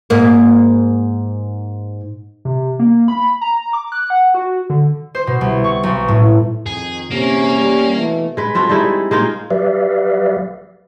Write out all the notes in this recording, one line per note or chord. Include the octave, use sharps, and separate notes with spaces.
G#2 A#3
C3
A#3
B5
A#5
D6
F#6
F#5
F#4
D3
C5
B2
C2
C#6
B1
A2
F2 D#3 G#4
G1 E2 C3 A#3 C#4 A#4
G3
B2 E3 A3
G#3 B4
C4 F4 F#4 A4
G3 G#3 D#4 E4
G#3 A#3 D#4 F4
F#3 G4 B4 D5 E5 F5